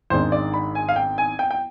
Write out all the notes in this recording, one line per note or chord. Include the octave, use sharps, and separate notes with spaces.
G#1 G#2 D#3 G#3 D4 C5
D5
B5
G#5
F5
G5
G#5
G5
G5